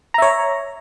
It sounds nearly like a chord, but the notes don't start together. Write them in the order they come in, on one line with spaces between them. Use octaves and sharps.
A#5 E5 C#5